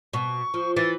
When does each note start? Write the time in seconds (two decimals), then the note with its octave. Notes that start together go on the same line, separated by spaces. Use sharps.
0.13 B2 C#6
0.54 F3
0.76 E3 A6